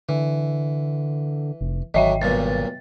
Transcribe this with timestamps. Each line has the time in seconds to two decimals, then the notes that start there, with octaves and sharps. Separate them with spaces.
0.09 D3 E3
1.61 F1
1.94 G#1 D3 F#3 D#5 E5 G5
2.22 B1 G2 A#2 A6